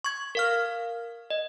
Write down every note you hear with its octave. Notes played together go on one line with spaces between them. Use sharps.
C#6 G#6
A#4 F5 F6
D#5